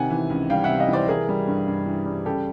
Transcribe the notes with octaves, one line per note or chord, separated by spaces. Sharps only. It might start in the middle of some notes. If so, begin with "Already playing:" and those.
Already playing: C3 D#3 F#5 G#5
E3
C#2
G3 F5 G5
E5 F#5
C3
D#5 F5
E3 C5 D5
E3 G#4 A#4
G3
G2
G2
E3
G3
C#3 G4 A4